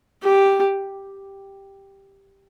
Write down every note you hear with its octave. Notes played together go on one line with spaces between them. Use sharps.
G4